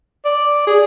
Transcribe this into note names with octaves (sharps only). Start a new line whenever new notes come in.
D5
G#4